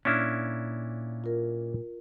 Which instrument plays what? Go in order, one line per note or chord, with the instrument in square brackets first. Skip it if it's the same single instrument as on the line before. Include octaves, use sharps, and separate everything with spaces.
[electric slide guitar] A#2 [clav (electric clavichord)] C#4 D4 E4 [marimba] F6
[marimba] F4 A#4